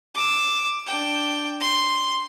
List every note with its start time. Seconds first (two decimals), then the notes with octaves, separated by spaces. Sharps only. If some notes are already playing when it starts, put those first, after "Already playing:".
0.15 D6 E6
0.86 D4 G5
1.60 C6